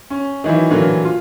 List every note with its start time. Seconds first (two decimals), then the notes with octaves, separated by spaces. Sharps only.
0.10 C#4
0.44 D#3 E3 F#3 E4
0.70 A#2 D3 E3 F#3 A3 A#3
1.05 F4